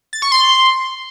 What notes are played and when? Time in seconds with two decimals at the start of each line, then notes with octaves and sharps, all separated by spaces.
0.13 A6
0.22 C#6
0.32 C6